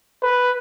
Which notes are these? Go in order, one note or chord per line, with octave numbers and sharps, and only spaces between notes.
B4